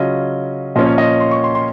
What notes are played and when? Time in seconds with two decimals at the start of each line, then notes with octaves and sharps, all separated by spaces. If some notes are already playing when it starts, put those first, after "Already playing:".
Already playing: C#3 F#3 C#4 F4 D#5
0.75 A#2 F3 A#3 C#4 D#5
0.86 C#5
0.98 D#5
1.20 C6
1.31 C#6
1.44 C6
1.55 C6